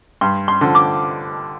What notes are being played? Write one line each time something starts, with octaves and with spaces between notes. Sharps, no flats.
G2 C6
C6
D3 F3
D6